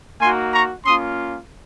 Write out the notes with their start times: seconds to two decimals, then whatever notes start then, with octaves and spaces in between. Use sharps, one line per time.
0.20 A#3 D#4 F#4 G#5 C6
0.53 A#5 C#6
0.86 A#3 C#4 F4 C6 D#6